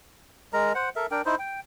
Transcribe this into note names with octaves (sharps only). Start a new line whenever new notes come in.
G#3 A#4 A#5
C5 F#5
A4 A#4 E5
D4 A#4 G5
D#4 E4 C5
G5